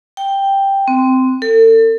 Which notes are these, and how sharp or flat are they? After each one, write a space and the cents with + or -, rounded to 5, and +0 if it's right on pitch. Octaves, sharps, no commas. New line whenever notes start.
G5 +5
C4 -15
A4 +40